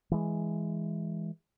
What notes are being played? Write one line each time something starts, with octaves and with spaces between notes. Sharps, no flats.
E3 G#3